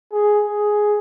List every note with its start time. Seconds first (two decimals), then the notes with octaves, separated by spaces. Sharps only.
0.12 G#4
0.48 G#4